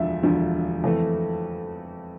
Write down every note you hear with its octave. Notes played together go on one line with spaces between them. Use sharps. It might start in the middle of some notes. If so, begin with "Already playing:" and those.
Already playing: E1 D2 D3 F3 E5
E1 D2 D3 F3
F2 E3 A3